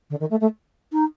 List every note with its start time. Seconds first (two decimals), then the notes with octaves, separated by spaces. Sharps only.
0.10 D3
0.20 D#3
0.30 A3
0.40 A3
0.92 D#4